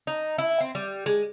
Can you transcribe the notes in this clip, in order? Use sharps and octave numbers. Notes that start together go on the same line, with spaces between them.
D#4
E4
C4
G3
G#3